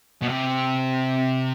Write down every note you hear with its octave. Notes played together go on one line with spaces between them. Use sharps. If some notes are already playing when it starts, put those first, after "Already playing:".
B2
C3